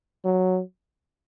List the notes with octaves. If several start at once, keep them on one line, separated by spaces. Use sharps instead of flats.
F#3